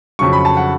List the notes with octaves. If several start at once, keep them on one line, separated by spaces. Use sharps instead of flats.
F2 C#3 F#3 C#6
B5
A5
F#5